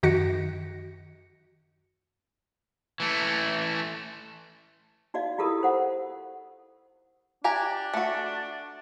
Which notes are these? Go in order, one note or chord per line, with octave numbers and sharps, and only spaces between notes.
F#2 D#3 F#4 A#6 C#7
E3 A3
D#4 F#4 D5 D#5 F5
E4 F4 G4 A4 A#4 D#6
C5 F#5
D4 G4 G#5 A#5
A3 F#4